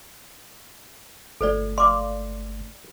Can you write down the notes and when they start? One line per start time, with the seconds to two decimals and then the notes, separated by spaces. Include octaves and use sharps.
1.41 G1 A3 A4 C5 D5
1.78 D5 F5 C6 D6